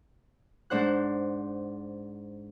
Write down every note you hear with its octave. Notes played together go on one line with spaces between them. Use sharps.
G#2 D4 C5 F#5 F#6